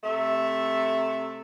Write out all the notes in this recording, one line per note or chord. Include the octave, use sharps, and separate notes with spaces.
C3 A3 E5